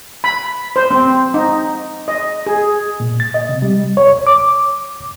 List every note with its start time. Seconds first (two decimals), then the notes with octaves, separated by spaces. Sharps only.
0.24 B5
0.76 C5
0.91 C4
1.34 D#4
2.08 D#5
2.46 G#4
3.00 A#2
3.20 A6
3.34 D#5
3.49 C3
3.62 G3
3.97 C#5
4.27 D6